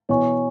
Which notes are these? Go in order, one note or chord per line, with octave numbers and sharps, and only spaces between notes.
B2 E3 C#5 G#5 C#6